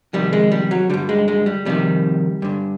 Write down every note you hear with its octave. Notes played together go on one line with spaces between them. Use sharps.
F2 C3 D#3 G3
G#3
G3
F#3
G2 D3 G3
G#3
G#3
G3
F2 C3 D#3 G3
G2 D3